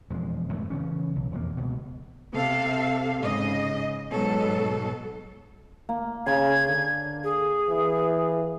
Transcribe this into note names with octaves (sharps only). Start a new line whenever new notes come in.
E1 F2 F3 G#3
F2 G#2 B2 A3
C#3 E3 C#4
B1
E1 F2 A#3
C#2 B2
C3 A4 F5
G#2 C#3 D#5
G#2 B2 F#3 A4
A#3
C#3 C6 G#6
D3
G#4
E3